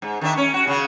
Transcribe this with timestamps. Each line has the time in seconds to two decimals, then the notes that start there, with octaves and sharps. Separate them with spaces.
0.02 G#2
0.21 D#3 D4 E5
0.37 C#4
0.54 F#4
0.67 C#3 F#4